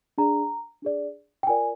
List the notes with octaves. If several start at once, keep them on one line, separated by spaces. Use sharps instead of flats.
D4 G#4 D5 A#5
D4 G#4 D5
G5
F4 A#4 D5 G#5